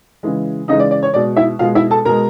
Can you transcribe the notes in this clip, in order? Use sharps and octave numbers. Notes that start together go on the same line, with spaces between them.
C#3 E3 G#3
C#3 E3 G#3 D#4 D#5
D5
D5
C#5
B2 G#3 D5
E4 E5
B2 G#3 F4 F5
E4 E5
A4 A5
B2 G#3 A#4 A#5